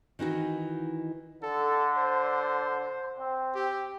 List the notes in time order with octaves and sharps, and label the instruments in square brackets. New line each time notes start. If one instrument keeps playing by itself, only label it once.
[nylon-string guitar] D#3 E3 D#4 F#4
[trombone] D3 [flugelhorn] A4
[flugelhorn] C5
[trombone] C4
[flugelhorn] G4